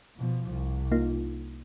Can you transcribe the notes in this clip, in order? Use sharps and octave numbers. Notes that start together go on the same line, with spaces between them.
B2 F3
C2
A#3 D#4 F4